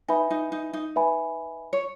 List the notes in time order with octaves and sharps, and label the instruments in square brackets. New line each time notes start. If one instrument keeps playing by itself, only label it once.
[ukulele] D#4 [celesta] B4 E5 G#5 B5
[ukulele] D#4
D#4
D#4
[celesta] B4 E5 G#5 B5
[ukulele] C#5